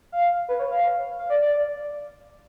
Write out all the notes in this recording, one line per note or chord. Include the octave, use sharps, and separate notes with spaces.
F5
B4
C#5
F5
F5
D5
D5